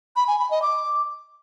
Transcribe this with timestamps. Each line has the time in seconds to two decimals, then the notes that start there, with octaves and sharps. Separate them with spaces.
0.16 B5
0.28 G#5
0.39 B5
0.51 D#5
0.62 D6